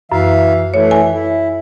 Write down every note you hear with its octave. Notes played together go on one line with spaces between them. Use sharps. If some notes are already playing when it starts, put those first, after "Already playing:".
F#2 E3 E5 F5
E3 A3 C#5
G#5
E4